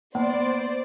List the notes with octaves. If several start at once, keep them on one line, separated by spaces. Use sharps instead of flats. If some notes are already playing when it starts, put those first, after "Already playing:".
A#3 B3 C5 D5